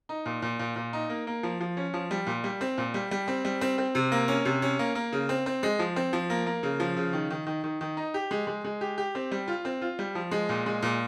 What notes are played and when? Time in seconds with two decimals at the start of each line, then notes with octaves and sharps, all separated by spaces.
0.09 D#4
0.26 A#2
0.42 A#2
0.59 A#2
0.76 A#2
0.93 D#4
1.09 A#3
1.27 A#3
1.43 F3
1.61 F3
1.77 C#4
1.94 F3
2.11 G3
2.27 A#2
2.44 G3
2.61 C4
2.78 A#2
2.94 G3
3.11 G3
3.28 C4
3.45 G3
3.61 C4
3.78 C4
3.95 C3
4.12 A#3
4.28 C#4
4.45 C3
4.62 C#4
4.79 A#3
4.95 A#3
5.13 C#3
5.29 C4
5.46 C4
5.63 G#3
5.79 F3
5.96 C4
6.13 F3
6.30 A#3
6.46 A#3
6.63 C#3
6.80 F3
6.97 C#3
7.13 D#3
7.30 D#3
7.47 D#3
7.64 D#3
7.81 D#3
7.97 D#4
8.14 G4
8.31 G#3
8.47 G#3
8.64 G#3
8.81 G4
8.98 G4
9.15 C4
9.32 G3
9.48 F4
9.65 C4
9.82 F4
9.99 G3
10.15 F3
10.31 G#3
10.49 A#2
10.66 G#3
10.83 A#2